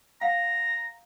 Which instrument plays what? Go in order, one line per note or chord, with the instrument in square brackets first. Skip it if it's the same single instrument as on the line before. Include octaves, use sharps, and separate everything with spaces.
[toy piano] F5 F#5 [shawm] A#5